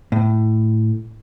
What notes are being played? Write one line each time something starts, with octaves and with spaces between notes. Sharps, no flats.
A2